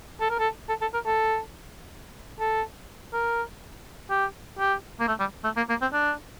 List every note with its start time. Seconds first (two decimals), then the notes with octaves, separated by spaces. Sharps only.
0.21 A4
0.30 A#4
0.39 A4
0.69 A4
0.81 A4
0.94 A#4
1.06 A4
2.40 A4
3.13 A#4
4.10 G4
4.59 G4
5.00 A#3
5.08 A3
5.20 G3
5.44 A3
5.57 A#3
5.69 A#3
5.81 C4
5.93 D4